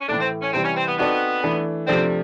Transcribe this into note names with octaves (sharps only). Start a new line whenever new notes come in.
C#4
A2 E3 A3 D4
C4
C#4
C3 E3 G3 C4
C#4
C4
B3
B3 C4 D#4 F#4 A4 D5
E3 A3 D4
C3 F3 A3 C4 D4